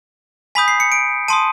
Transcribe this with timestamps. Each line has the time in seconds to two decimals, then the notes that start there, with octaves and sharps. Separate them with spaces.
0.55 G#5 B5 D#6 G6 B6
0.68 C7
0.80 C#7
0.92 D7
1.28 A5 C6 D#6 D#7